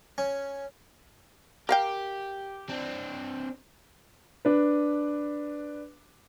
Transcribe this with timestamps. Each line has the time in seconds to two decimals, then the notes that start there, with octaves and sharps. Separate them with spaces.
0.18 C#4
1.69 G4 A#4 F5 G5
2.69 C4 D4
4.45 D4 B4